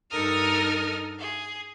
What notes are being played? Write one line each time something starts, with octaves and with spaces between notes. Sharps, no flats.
G2 D#4 A4 A#4 D#6 F6
G#4